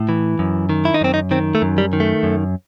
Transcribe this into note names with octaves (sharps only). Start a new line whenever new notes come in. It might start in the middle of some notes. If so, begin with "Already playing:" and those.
Already playing: A2
E3
F#2
D#3
E4
D#4
F#2 C4
D#4
D#3 C4
A3
F#2
G3
D#3
A3
F#2